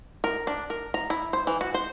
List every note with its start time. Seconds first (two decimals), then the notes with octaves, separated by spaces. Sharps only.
0.24 A#4
0.47 D4
0.70 A#4
0.94 A#5
1.10 E4
1.33 C5
1.47 E3
1.61 F#4
1.74 C5